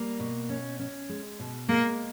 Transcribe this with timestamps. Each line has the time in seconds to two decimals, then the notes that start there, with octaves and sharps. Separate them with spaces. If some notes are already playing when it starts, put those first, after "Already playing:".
Already playing: G3 A#3
0.20 B2
0.49 C#4
0.79 C#4
1.09 G#3
1.40 B2
1.68 G#3 A#3